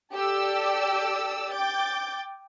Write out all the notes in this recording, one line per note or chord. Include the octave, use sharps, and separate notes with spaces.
G4 A4 D5 D6 E6
G5 D6 G6 A6